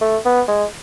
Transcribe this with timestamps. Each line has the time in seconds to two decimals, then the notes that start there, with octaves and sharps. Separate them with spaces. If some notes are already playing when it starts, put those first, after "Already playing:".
0.01 A3
0.25 B3
0.48 G#3